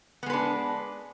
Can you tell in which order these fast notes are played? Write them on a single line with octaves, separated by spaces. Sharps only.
B3 G#3 B4 D4